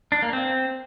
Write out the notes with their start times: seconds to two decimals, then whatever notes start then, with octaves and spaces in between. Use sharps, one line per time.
0.12 D4
0.22 A#3
0.33 C4